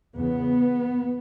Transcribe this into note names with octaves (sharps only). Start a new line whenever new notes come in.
E2 C#3 B3